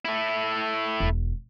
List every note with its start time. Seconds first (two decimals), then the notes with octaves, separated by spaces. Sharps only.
0.05 A3 E4
1.00 E1